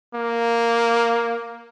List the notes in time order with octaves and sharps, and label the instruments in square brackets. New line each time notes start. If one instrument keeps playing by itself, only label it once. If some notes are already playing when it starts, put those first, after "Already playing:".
[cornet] A#3